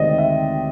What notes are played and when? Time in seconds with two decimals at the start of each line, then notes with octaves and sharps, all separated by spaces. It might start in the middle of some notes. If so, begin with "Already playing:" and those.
Already playing: D2 C3 D#3 G#3 C4 D5 D#5
0.18 E5